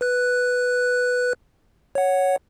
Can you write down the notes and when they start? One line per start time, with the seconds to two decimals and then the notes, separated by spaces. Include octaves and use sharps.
0.01 B4 F#6
1.95 C#5 F#5